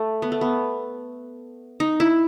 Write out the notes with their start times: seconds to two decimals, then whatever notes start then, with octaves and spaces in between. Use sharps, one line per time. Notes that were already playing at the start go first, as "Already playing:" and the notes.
Already playing: A3
0.22 B3
0.32 A3
0.41 B3
1.80 D#4
2.00 E4